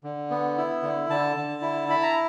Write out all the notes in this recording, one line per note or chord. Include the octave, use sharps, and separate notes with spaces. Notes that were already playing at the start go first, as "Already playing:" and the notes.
D3
B3
E4
D3
D3 A5
D3
E4
E4 B5
A#5